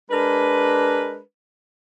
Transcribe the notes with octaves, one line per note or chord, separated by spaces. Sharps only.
G#3 D4 A#4 B4